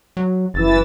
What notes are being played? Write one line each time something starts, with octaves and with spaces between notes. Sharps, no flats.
F#3
F#1 E3 E6 A6